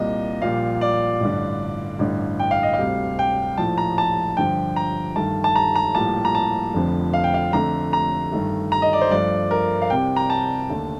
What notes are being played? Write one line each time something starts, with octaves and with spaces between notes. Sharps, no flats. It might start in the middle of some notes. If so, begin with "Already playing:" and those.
Already playing: C2 A#2 G3 A#3 D#5
A#1 A#2 G3 A#3 F5
D5
A1 G2 D3
A1 G2 D3
G5
F5
D#5
F5
D2 C3 G3
G5
A#1 A2 F3 A5
A#5
A5
G2 D3 F3 G5
A#5
G2 D#3 A3 A5
A5
A#5
A#5
A#1 A2 G3 A#3 A5
A#5
A5
F1 F2 D3 F3
F5
G5
F5
F2 D3 A3 A#5
A#5
G2 D#3 A3
A#5
D#5
D5
C5
G2 F3 A3 D5
A#4
F5
C2 C3 G3 G5
A#5
A5
D#2 D3 A3